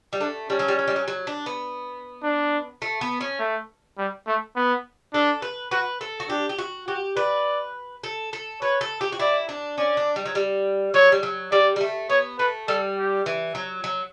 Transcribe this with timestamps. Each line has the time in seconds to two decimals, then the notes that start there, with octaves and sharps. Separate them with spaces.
0.13 G3
0.20 A3 D4
0.50 G3 C#4
0.59 F#3
0.68 G3
0.79 F#3
0.88 G3
0.96 F#3
1.08 F#3
1.27 D4
1.46 B3
2.23 D4
2.82 A3
3.01 B3
3.21 C#4
3.39 A3
3.98 G3
4.27 A3
4.56 B3
5.14 D4 A4
5.42 B4
5.71 F#4 B4
6.01 A4
6.20 F#4
6.30 D4 G4
6.49 G4
6.58 F#4
6.88 F#4 G4
7.17 B4 D5
8.04 A4
8.33 A4
8.62 B4 C#5
8.81 A4
9.01 G4
9.12 F#4
9.19 E4 D5
9.49 D4
9.78 C#4 D5
9.97 D4
10.16 G3
10.25 F#3
10.35 G3
10.94 F#3 C#5
11.12 G3
11.23 F#3
11.52 G3 D5
11.76 G3
11.81 A3
12.10 B3 C#5
12.39 A3 B4
12.68 G3 A4
12.97 G4
13.26 E3
13.55 F#3
13.84 F#3